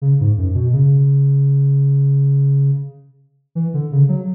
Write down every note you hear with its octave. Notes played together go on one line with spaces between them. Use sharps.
C#3
G#2
F#2
B2
C#3
E3
D3
C#3
F#3